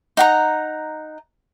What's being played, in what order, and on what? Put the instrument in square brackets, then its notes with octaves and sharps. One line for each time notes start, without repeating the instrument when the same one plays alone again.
[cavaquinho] D#4 F#5 A#5